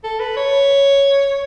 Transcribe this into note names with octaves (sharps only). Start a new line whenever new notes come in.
A4
B4
C#5